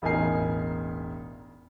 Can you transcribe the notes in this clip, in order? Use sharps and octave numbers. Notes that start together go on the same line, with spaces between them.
E1 A1 D#4 A#4 G#5 C7